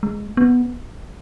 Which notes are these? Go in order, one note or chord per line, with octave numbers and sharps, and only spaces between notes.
G#3
B3